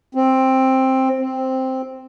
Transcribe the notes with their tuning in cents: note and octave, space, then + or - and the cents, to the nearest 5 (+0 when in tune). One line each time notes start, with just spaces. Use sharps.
C4 +10
C4 +0